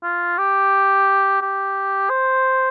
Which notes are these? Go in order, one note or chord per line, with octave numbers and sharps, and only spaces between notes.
F4
G4
G4
C5